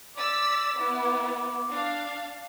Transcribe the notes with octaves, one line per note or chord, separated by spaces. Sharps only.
D5 D6 E6 B6
B3 E4
D4 F5